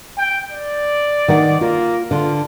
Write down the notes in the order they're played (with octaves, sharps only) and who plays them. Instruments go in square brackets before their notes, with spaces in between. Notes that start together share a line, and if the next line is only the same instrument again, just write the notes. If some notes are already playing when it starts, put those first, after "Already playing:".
[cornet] G5
D5
[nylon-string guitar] D#3 D#4 F#5
[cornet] A#3 [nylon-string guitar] F4
[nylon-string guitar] D3 [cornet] F4